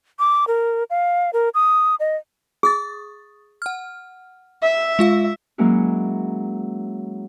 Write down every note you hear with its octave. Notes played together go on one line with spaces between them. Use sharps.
D6
A#4
F5
A#4
D#6
D#5
G#4 C#6 D#6 A6
F#5 F6
E5
G#3 F4 F5
F#3 G#3 A#3 C#4 E4 F#4